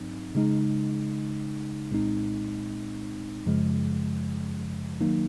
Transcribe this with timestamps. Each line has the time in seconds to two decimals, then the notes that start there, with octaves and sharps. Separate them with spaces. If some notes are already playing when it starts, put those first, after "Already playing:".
Already playing: G#2 F#3 C4 D#4
0.35 C#3 G#3 D#4
1.91 C2 A#2 G#3 C4 D#4
3.46 F#2 C#3 F3 G#3
5.00 D#3 F#3 A#3 D#4